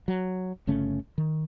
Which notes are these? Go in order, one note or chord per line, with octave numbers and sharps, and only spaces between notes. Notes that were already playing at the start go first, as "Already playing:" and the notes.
F#3
G1 C#3 A3 C#4
D#3